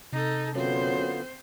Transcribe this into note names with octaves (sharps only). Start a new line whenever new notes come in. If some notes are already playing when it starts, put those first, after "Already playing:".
C3 D#4 A4
F#2 D3 B3 C4 F4 C5